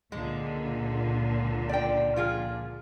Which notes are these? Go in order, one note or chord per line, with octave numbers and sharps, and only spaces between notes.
C#2 A#2 D3 G#3
D5 G5
F3 F4 G#4